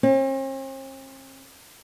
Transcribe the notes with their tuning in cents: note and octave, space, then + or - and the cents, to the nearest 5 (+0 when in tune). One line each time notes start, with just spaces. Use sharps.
C4 +45